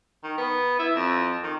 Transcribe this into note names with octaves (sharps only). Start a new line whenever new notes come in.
D#3
B3
E4
F2
D#3